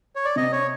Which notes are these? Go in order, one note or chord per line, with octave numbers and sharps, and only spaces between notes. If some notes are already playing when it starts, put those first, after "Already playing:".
C#5
D5
C3 D#5
C#5